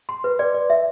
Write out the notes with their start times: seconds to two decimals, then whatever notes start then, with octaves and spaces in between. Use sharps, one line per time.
0.09 C6
0.24 B4
0.39 D5
0.54 D5
0.70 E5